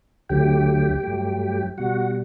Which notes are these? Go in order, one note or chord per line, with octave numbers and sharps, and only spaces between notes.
D2 D3 F#3 A3 G4 G5
G2 F#3 A3
B2 G3 F#4 F#5